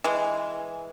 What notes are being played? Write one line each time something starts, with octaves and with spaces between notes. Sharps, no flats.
E3 G#3